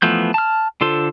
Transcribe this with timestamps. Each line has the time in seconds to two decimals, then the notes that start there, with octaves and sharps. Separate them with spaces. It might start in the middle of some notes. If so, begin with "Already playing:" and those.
0.02 E3 F3 A3 B3 G6
0.34 A5 F6
0.81 D3 F4 A4 C5